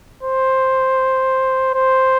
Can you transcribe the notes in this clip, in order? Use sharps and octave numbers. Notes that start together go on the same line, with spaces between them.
C5
C5